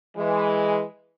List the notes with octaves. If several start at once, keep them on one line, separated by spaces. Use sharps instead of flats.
E3 G#3